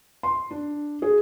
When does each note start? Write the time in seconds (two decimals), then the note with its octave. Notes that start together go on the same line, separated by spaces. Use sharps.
0.23 C6
0.51 D4
1.02 G#4